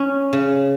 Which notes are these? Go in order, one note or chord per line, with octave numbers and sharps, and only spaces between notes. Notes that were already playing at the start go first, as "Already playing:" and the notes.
Already playing: C#4
C#3